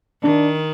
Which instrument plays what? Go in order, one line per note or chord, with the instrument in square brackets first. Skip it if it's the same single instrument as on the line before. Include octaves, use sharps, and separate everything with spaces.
[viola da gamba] D#3 [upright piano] D4